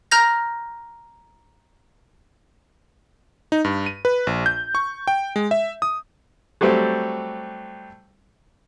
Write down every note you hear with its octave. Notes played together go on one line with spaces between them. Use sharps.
A#5 F6 G6 A#6
D#4
G2
D#7
B4
A#1
G6
C#6
G5
G#3
E5
D#6
F#3 G3 A3 C4 G4